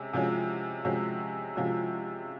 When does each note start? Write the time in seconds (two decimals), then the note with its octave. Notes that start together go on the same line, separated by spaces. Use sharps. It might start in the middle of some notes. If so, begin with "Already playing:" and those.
Already playing: C3 G#3 C#4
0.13 C3 F3 G#3 C#4 F#4
0.84 C3 F3 G#3 C#4 F#4
1.56 C3 F3 G#3 C#4 F#4